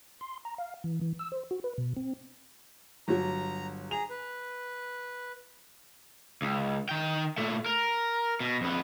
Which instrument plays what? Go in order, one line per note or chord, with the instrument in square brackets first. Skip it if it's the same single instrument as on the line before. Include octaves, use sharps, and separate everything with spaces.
[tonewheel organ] C6
A#5
F5
E3
E3
E6
C5
F#4
B4
B2
C4
[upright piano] G1 F#3 [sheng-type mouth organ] A#5
[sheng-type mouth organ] G#4 A#5 [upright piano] F7
[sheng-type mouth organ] B4
[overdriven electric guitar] C#2
D#3 G5
A#2 A3
A#4
B2
F2 B3